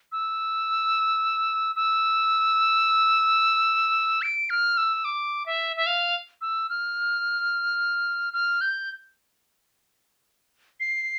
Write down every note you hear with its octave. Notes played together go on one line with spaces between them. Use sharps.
E6
E6
D7
F6
E6
D6
E5
E5
F5
E6
F6
F6
G6
C7